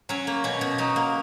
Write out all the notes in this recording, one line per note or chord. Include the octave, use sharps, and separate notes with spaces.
F#3 C#4
A#3
B2 C#4
B2
F#3 D#4
A#3